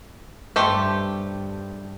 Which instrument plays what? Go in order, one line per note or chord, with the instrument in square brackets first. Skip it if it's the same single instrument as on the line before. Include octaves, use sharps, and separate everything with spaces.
[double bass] G2 [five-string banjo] A3 G4 C5